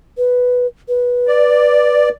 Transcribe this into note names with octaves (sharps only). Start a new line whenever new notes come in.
B4
B4
D5